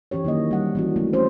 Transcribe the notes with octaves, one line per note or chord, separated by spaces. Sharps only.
E3 C#4 G4 C#5
D#3 F#3 A#3 D#5
G3 F#5
E3 C#4 F#4
F#3 A3 C4
C#4 C5